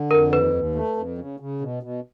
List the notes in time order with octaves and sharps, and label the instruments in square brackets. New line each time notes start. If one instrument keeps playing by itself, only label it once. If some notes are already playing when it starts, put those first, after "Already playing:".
Already playing: [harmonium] D3
[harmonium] F2 [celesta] A#4
[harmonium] D#2 [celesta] B4
[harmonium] D#2
A3
F2
C#3
C#3
B2
B2